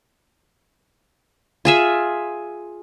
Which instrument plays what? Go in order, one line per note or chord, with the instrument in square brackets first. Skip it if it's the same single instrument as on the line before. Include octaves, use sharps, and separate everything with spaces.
[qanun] F4 G#4 E5